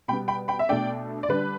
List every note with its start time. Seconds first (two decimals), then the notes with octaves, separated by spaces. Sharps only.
0.08 B2 G3 B3 G5 B5
0.28 G5 B5
0.48 G5 B5
0.59 E5
0.69 B2 A3 D4 D5 G5
1.23 D5
1.29 D3 G3 D4 B4